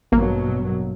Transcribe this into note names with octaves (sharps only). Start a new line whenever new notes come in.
A1 G2 B2 F#3 A#3